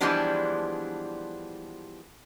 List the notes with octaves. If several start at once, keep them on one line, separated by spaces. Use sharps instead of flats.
E3 F3 G3 G#3 B3 D4